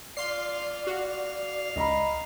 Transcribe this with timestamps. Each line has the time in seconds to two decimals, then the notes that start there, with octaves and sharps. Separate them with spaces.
0.17 F4 D5 F5 C6 C7
0.87 F#4 F5
1.76 C#2 D#5 A#5 B5